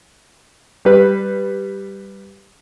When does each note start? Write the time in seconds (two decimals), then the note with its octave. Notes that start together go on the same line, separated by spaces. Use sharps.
0.85 G3 B4